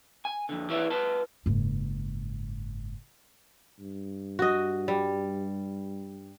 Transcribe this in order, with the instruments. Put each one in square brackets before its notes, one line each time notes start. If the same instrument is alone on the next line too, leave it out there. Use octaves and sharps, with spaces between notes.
[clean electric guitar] G#5
F2 D3
E4 B4 C#5 D5 E5
F4 B4 A5
[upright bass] F#1 G#2
[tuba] G2
[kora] F#4 D#5
G3